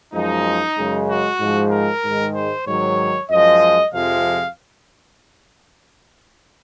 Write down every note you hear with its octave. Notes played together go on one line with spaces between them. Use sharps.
F#2 F3 G#3 D#4
F#2 C#3 G#3
F#4
G#2 F3 G#3
A#4
G#2 D#3 G#3
C5
G#2 D#3 F#3 C#5
F#2 F3 G#3 D#5
F2 C3 F3 G#3 F5